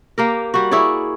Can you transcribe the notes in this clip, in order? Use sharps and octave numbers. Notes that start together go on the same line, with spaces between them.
A#3 G4 A#4
G3 F#4
E4 G#4 C#5 D5